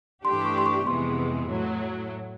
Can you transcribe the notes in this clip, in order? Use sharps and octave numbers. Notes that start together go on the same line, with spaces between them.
G2 E3 A3 D4 G4 C6
C#6
C6
C#6
F2 C3 E3 G#3 B3 C6
A2 F#3 A3